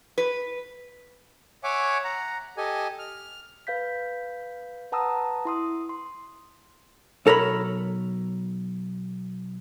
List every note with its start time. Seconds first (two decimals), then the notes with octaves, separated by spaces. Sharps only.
0.18 B4
1.64 C#5 E5 F#5 G#5 D6
2.04 F#5 A#5
2.57 G4 A4 D#5 G#5
2.99 F6
3.67 B4 F5 G6 B6
4.92 B4 F#5 A5 A#5 D#6 E6
5.45 E4 C6 D#6
5.89 C6
7.26 B1 A4 A#4 C#5 B5